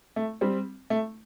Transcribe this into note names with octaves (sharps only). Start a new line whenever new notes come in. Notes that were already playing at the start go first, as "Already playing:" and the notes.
A3
G3 C4
A3